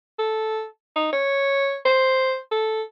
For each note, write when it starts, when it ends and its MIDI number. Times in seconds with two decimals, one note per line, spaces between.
0.19 0.65 69
0.96 1.11 63
1.13 1.77 73
1.85 2.37 72
2.51 2.82 69